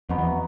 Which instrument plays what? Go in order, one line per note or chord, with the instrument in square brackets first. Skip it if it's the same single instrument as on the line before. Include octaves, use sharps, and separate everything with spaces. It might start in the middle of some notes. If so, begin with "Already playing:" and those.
[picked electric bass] F2 [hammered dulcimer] B3 D#4 F#4
[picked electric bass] E2